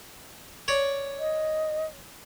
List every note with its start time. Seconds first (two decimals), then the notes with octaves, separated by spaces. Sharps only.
0.68 C#5 D5
1.19 D#5